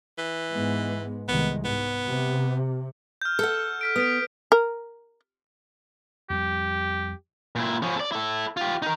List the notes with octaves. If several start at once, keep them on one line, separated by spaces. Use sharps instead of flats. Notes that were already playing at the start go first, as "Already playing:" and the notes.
E3
G#2 G#3 B3
C2 D#3 G#3 B3
G#2 B3
C3
F6 G6
A4 F#5
F6 B6 D7
B3 D#6 B6 D7
A#4
F2 G3 G4
A#2 E4
F3 C#4
A4 D5
E4 A4
F4 G4
D#4 A#4